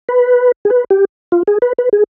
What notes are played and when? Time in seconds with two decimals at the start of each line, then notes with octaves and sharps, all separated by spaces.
0.09 B4
0.65 G#4
0.70 B4
0.90 G4
1.32 F4
1.48 G#4
1.62 B4
1.78 B4
1.93 G#4